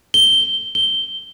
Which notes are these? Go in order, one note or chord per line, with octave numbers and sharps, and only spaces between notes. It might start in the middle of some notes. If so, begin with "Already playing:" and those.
G7
G7